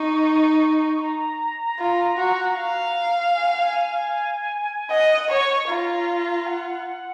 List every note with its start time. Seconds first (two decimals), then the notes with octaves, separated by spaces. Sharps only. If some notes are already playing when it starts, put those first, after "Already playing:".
Already playing: D#4 C#6
1.01 A#5
1.79 F4
2.18 F#4
2.58 F5
3.34 G#5
3.49 F#5
3.63 G#5
4.90 D#5 F#5
5.30 C#5 C#6
5.69 F4 A#5
6.47 F#5